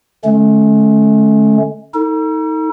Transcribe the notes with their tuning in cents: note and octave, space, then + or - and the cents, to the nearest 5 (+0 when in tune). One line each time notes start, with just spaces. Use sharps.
D3 +0 A3 -45 C#4 +0
D#4 +30 A4 +35